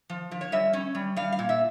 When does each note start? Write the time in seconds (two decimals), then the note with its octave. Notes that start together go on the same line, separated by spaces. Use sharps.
0.10 F3
0.31 F3
0.41 C#5
0.52 G3 E5
0.73 C#4
0.95 G3
1.16 G3 F5
1.32 F5
1.39 A#2
1.49 E5